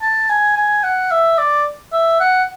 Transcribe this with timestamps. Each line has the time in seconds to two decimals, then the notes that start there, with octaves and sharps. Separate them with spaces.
0.02 A5
0.29 G#5
0.56 G#5
0.83 F#5
1.11 E5
1.38 D5
1.93 E5
2.20 F#5